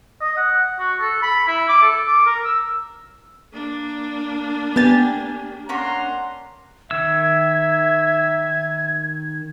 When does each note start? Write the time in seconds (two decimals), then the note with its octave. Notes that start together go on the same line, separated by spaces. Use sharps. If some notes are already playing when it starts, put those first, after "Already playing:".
0.21 D#5
0.37 F#5
0.79 F#4
1.00 A4
1.23 B5
1.48 E4
1.69 D6
1.82 A4
2.07 D6
2.26 A#4
2.45 E6
3.53 A#3 D4
4.76 B3 G4 G#5 A6
5.69 A#3 C#4 D4 F#5 A#5 C6
6.91 D#3 E5 E6 G#6